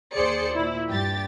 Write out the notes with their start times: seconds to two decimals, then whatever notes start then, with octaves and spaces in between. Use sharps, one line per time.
0.15 D#2 G#4 C5 D5 C#7
0.55 A#2 E4
0.88 G2 G4 A6